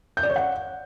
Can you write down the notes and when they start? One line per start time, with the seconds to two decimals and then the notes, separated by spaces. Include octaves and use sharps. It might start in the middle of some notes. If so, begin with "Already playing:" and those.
0.17 G6
0.23 D5
0.30 C#5
0.36 F#5